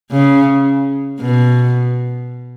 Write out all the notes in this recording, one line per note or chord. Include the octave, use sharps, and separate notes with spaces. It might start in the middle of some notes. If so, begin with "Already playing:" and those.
C#3
B2